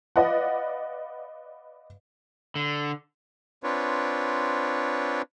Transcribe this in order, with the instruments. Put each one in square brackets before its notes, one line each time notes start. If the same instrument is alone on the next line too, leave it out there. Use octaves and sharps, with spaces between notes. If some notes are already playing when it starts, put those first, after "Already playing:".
[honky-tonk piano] B4 D5 D#5 F5 F#5
[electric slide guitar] D3
[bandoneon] C4 D4 F4 B4 C#5